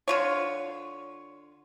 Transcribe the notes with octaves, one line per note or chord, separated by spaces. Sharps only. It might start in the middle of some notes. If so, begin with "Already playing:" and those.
D3 F4 C#5